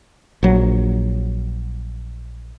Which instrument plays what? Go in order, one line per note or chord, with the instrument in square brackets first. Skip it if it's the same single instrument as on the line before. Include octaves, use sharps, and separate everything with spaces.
[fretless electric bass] A#1 F#3